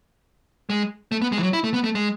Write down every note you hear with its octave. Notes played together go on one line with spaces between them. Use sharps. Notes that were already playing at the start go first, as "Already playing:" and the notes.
G#3
A3
B3
G#3
E3
F#3
E4
A3
B3
A3
G#3